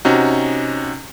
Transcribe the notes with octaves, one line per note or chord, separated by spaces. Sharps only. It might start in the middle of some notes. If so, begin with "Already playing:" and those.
C3 C#4 D#4 F#4